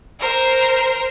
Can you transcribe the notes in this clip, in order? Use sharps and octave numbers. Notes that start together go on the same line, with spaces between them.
A#4 C5